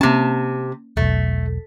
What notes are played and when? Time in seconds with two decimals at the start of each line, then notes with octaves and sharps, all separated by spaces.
0.01 C3 A#3 C#4 A5
0.97 E1 B1 A3